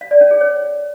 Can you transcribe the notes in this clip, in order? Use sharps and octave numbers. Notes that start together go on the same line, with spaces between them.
F5
D5
C#4
G#4
C#5